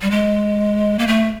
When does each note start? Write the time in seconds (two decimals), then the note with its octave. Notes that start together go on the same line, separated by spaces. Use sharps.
0.02 G3
0.11 G#3
0.99 A#3
1.07 A3